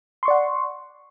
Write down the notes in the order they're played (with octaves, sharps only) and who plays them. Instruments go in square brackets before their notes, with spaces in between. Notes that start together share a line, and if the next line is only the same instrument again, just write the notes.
[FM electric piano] C6
C#6
D5
F#5